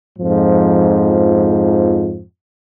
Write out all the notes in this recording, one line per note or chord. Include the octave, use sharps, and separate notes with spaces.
F2 G#2 F3